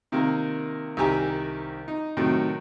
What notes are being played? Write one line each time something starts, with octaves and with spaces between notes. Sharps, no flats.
C3 D#3 A#3
C2 D#3 G4 G#5 A#5
D#4
A2 C3 D#3 F#3